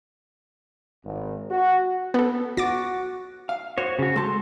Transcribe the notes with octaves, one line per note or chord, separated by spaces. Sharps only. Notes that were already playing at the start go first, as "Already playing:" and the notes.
G#1
F#4
B3 A4
F#4 D6 A6 A#6
F5
F#4 C5 C#5
C#3 F#4
G#3 A4 A5 C6 G6